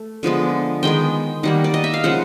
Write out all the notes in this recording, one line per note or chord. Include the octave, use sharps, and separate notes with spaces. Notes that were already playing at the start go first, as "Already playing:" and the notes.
Already playing: A3
D3 F3 G#3 B3
D#3 G#3 B3 G5
D#3 G3 A#3 F#5
D5
D#5
E5
F5
C#3 F3 G#3 F#5